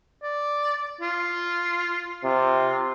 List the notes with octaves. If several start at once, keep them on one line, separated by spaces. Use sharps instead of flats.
D5
F4
C3 F4